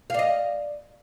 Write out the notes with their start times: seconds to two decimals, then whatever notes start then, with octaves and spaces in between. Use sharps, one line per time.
0.10 F5
0.14 D5
0.19 D#5